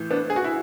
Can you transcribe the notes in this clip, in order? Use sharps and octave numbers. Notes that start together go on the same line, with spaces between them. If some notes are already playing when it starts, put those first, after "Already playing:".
Already playing: A2 E3
B3 D4
G#4
F#4
E4